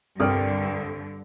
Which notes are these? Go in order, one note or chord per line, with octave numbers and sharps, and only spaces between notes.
C2 G2 D3 A#4 D5 G5 D#6 F6